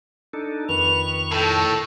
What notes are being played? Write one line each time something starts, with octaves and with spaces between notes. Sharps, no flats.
D4 D#4 A4
F2 D#3 B4 C#6 F7
A2 A4 G5